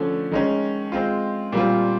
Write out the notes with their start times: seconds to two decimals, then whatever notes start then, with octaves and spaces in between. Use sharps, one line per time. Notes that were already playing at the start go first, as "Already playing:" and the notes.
Already playing: D3 F3 A3 C#4
0.32 D#3 G#3 C#4
0.92 G#3 C4 F4
1.52 A#2 G3 C4 F4